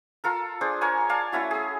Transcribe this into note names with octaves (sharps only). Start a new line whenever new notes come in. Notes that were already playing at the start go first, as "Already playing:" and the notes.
F4 A4 A#4
D4 G#4 C5
A#4 C#5 G#5
D5 F5 G#5 A5
A3 C#4 E4 F#4
G#4 A4